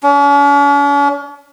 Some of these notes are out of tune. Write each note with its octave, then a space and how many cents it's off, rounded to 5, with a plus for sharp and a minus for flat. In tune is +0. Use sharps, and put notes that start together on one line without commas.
C#4 +45